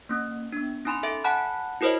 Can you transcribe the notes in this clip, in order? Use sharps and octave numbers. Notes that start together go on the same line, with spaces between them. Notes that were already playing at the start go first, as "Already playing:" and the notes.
A#3 C#4
B3 D4
C#4 D#4 G#5 B5 C6
A4 E5 D7
F#5 G#5 A5 B5 F#6
E4 F#4 A#4 C5 C#5 D#5